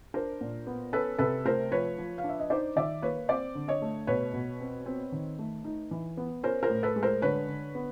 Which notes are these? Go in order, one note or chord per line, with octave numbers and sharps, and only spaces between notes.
D4 A#4 C5
A#2
B3
C#4 A4 B4
C3 A4 B4
A3 A#4 C5
F3 B4 C#5
F3
F5
D4
E5
D#5
D#4 C5 D5
D#3 D5 E5
A#3 B4 C#5
C4 C5 D5
D3
C#5 D#5
A3
B2 B4 C#5
B2
C4
C4
D#3
A3
D#4
E3
B3
C#4 A#4 C5
A#4 C5
A2
A4 B4
G#3
A#4 C5
D3 B4 C#5
D3
B3